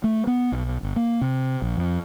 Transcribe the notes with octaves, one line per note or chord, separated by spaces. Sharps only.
A3
B3
B1
G1
A#3
C3
A#1
F2